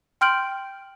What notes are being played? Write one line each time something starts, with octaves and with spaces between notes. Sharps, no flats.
G5 C6 F6 G6 D7 F#7